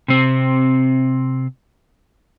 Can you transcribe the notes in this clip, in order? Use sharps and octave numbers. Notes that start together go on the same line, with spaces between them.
C3 C4